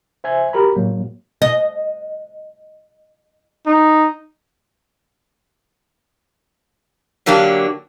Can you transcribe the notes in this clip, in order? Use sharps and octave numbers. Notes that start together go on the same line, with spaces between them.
C5 E5 G#5 G#6
F#4 G4 A#4 A#5 B5
A2 F#3 A#3
D#5
D#4
D3 F#3 A#3 D4 G4